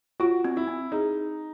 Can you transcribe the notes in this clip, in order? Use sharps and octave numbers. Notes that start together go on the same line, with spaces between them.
F4 F#4
C4
E4
C4
D#4 G#4